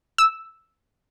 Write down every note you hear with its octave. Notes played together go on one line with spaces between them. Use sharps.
E6